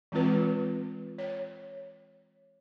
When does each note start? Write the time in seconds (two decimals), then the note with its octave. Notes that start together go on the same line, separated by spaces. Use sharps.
0.12 E3 G#3 C4 F4 B4
1.18 C#5